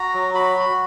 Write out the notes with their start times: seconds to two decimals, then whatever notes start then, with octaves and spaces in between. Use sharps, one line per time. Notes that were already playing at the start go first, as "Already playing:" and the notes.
Already playing: F#4 A#5
0.14 F#3
0.34 F#4 B5
0.56 F#4